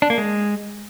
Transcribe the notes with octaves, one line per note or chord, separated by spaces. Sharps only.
D4
A#3
G#3